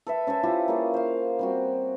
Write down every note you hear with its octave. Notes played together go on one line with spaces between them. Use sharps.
A4 B4 E5
C#4 A4 C5 E5
E4 F4 G4 B4
A#3 G#4 C#5
C5 F5
G3 C4 F#4